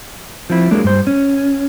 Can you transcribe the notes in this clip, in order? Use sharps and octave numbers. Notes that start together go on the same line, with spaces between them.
F3 C4 E4
F#3 G#3 A#3 D4
G2 C5
C#4